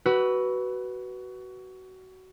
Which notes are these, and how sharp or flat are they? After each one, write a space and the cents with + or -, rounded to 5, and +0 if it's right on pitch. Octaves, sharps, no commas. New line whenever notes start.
F#4 +20 B4 -5 E6 +0